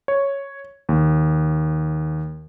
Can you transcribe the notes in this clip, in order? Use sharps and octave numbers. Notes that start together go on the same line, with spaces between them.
C#5
D#2